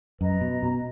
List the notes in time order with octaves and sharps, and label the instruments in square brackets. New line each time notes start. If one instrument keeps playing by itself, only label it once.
[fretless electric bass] F#2 [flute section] B4 D#5 A#5
[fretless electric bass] B2
B2